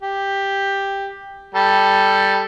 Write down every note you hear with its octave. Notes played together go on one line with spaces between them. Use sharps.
G4
G3 A4